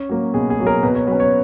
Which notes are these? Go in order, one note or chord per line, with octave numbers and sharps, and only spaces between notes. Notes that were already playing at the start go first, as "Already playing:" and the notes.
Already playing: C#4
F#3 A#3
B2 G#4
G#4
F#3 A#3
A#4
B2 B4
C#5
F#3 B4
C#4
C#5